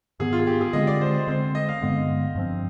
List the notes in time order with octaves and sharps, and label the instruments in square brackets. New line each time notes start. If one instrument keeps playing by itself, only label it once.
[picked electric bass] G#2 D#3 B3 [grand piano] G#4
[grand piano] F4
G#4
G4
G#4
[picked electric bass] D3 G#3 C4 [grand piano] D#5
[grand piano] D5
C5
C5
[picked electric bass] D3 G#3 C4 [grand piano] C5
[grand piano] D#5
F5
[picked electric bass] G2 D3 G#3 B3
G2 F3 C4